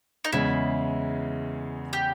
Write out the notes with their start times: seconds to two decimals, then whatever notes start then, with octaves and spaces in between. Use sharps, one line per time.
0.25 D#4
0.32 E2 C#3 G#3 E4
1.93 G4